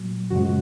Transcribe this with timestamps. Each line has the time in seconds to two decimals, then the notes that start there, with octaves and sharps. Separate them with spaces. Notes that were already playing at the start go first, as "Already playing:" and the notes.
Already playing: A#2 F#3
0.30 F#2 C#3 F3 G#3 F#4